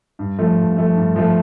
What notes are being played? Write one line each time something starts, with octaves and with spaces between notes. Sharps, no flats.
G2
F3 A3
G2
F3 A3
G2
F3 A3